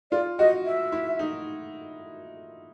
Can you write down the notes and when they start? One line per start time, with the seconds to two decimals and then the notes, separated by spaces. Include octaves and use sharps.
0.11 F4 D5
0.39 F#4 D#5
0.65 E5
0.92 E4
1.19 D#4